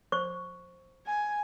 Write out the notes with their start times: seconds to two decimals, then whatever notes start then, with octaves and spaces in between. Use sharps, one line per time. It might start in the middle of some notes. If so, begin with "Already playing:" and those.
0.12 C5 C#6
1.06 G#5